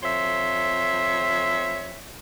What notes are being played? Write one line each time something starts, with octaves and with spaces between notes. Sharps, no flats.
F2 C5 C#5 E5